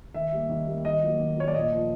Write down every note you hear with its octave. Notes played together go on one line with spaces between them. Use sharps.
D#3 E5
G3 A#3
D#3
G3 A#3
D#3 D#5
F#3 A#3
D#3
F#3 A#3 C#5
D5
A#2 D#5
F3 A#3